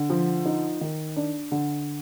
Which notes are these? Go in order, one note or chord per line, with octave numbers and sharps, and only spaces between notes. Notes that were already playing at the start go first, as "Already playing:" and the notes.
Already playing: D3
F3
D#4
D#3
D4
D3